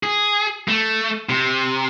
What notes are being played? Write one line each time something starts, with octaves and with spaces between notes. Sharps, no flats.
G#4
A3
C3